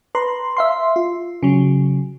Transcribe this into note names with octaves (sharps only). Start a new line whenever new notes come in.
B4 A#5 C6
E5 F5 C6
F4
C#3 F#3